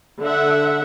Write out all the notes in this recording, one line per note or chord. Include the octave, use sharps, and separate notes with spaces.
D3 A4 E5 F#5